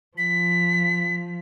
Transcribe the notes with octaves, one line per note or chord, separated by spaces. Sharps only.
F3 B6